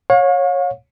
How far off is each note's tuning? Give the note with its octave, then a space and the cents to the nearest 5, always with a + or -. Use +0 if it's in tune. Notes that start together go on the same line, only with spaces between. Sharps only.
C#5 -10 F5 +40